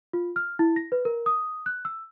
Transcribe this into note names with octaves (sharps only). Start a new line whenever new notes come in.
F4
F6
E4
A#6
B4
A#4
D#6
F#6
E6